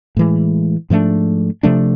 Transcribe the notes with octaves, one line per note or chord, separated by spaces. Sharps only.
A2 E3 G#3
G#2 F3 A3 D4
C3 F3 A3 D4